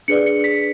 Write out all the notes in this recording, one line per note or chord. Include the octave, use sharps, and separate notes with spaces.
D4 G#4 B4 D5 C#7
C#7
B6